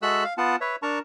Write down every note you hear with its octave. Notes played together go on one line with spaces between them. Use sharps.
G#3 F#4 A4 E5 E6 F#6
F5
B3 F4 F#5 A5
B4 C#5 E5
D4 A#4 A5 A#5 C#6